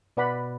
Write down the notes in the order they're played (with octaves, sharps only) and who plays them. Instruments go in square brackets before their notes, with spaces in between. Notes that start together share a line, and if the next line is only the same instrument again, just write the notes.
[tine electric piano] B2 [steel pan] B4 D5 F#5 B5